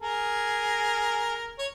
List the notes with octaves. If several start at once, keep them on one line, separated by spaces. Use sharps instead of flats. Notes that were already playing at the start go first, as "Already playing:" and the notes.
G#4 A#4
C#5